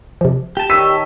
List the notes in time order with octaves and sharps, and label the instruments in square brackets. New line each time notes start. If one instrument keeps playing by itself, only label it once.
[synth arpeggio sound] C3 F3
[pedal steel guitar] G4 A5
[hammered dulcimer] D#3 C#5 C#6 [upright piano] E6 B6 D#7